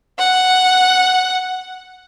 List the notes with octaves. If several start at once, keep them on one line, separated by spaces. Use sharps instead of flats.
F#5